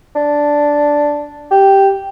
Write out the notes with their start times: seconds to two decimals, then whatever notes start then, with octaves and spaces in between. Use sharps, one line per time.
0.16 D4
1.51 G4